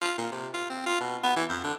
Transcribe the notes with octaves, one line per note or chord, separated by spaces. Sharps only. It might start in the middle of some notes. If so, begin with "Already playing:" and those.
F4
A#2
C3
F4
C4
F4
B2
B3
E3
F2
D3